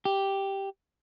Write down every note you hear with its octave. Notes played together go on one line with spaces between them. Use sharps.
G4